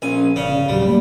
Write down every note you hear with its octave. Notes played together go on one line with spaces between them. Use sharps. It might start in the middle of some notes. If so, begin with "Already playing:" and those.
A#1 C#4 G#5
G1 C#3 C#4 D5
D#1 A#1 F#3 G3
G2 C#3 A3 A#3